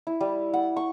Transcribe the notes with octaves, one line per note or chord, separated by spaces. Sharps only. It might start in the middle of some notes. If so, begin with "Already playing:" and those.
E4
G3
F#5
C#6